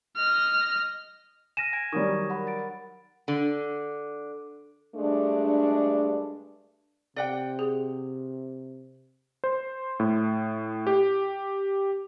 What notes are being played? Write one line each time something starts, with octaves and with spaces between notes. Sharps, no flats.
D#5 F6
G#5 F6 A#6 D#7 E7
G#5 G#6 D7
D#3 F#3 G3 C#6 D#6 G#6
A#4 F#5 B5
A6 D7
D3
G2 G#3 A3 D4
C3 D5 F#5 G5
G#4
C5
A2
G4